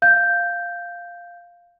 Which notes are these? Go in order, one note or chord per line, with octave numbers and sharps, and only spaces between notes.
F5 G6